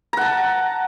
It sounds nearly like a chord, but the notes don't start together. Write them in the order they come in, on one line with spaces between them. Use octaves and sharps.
A#5 F#5 A5